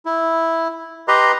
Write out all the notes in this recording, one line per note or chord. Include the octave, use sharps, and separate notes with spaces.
E4
G4 B4 D#5 A#5 C6